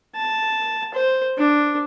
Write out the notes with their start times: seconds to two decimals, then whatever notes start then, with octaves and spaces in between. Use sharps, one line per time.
0.16 A5
0.95 C5
1.38 D4